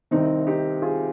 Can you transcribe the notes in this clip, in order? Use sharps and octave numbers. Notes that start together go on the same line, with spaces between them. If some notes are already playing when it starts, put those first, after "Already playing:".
C2 C3 D#3 C4 D#4
D#4 G4
F4 G#4